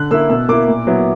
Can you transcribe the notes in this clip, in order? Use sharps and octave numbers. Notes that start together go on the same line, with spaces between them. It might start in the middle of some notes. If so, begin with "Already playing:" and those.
Already playing: D3 F#6
A#3 E4 E6
B2 E6
A#3 E4 D6
A#2
F#3 B3 E4